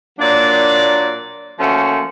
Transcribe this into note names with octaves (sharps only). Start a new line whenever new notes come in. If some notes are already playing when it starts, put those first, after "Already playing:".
A#2 F#3 A#3 D4 D5
F3 A3 A#3 C#4 F#4